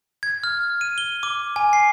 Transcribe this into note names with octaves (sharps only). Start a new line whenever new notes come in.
G#6
F6
D#7
G7
D6
G#5
C7